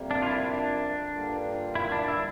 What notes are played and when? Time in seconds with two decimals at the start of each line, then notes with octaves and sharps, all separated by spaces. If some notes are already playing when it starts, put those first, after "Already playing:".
Already playing: F2 C3 G3 A#3
0.11 D4
0.22 F4
0.27 E4
0.44 D4
1.09 G2 D3 G3 A#3 F4
1.75 E4
1.92 D4
2.08 E4